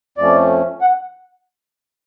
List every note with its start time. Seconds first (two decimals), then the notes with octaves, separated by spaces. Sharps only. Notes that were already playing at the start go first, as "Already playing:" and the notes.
0.18 F2 F3 A3 C#4 D5
0.81 F#5